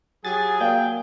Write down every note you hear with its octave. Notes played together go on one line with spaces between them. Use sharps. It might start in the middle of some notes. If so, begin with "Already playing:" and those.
F#3 G4 G#4 G#5 A6
A#3 D5 F5 G5 G#5